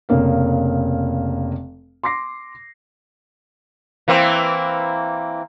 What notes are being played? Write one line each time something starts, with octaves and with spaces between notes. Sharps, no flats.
F1 C#3 A#3 F5
C6 D6 A#6 C7
E3 A#3 C4